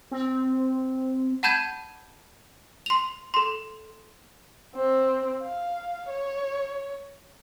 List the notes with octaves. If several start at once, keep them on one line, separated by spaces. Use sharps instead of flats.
C4
F#5 A5 B5 G6 G#6 D#7
C6 F7
A4 C6
C4
F5
C#5